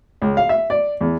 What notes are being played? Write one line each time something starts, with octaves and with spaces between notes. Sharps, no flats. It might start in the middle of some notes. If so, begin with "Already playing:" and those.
C#2
F5
E5
D5
E2